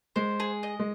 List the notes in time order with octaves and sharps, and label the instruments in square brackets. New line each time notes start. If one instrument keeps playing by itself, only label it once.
[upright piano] G#3 [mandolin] C5
[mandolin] G#4
D#5
[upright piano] G#3